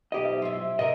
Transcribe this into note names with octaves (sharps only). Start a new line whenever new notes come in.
B1 G4 D#5
C5 E5
E4 F4
C3 A#4 D#5